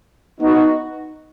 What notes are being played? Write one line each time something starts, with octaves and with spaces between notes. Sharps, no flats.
B3 D#4 F#4